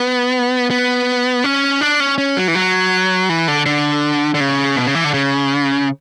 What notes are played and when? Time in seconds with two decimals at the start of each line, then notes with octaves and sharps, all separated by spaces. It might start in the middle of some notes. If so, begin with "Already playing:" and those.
Already playing: B3
0.71 B3
1.44 C#4
1.81 D4
2.00 C#4
2.18 C#4
2.37 F#3
2.48 E3
2.55 F#3
3.29 E3
3.48 D3
3.66 D3
4.34 D3
4.40 C#3
4.76 B2
4.86 C#3
4.95 E3
5.04 D3
5.14 C#3